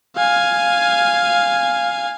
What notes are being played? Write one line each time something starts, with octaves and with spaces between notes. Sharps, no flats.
F5 G#5